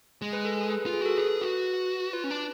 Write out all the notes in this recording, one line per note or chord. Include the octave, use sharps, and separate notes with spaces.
G#3
B4
A4
G#4
B4
F4 B4
G#4
F#4 A4
G#4 B4
F#4
F4 B4
C#4
D4